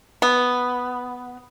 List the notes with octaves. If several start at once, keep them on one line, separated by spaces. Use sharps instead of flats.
B3